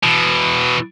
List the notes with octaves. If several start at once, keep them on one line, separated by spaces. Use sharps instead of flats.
B2 E3